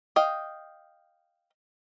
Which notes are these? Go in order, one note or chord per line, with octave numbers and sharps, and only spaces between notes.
D#5 F5 G5